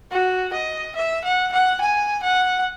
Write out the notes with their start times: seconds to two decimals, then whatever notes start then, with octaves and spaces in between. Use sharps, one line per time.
0.11 F#4
0.53 D#5
0.95 E5
1.24 F#5
1.52 F#5
1.81 G#5
2.23 F#5